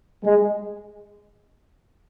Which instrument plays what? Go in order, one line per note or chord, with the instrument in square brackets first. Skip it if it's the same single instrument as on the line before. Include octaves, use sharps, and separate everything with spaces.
[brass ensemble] G#3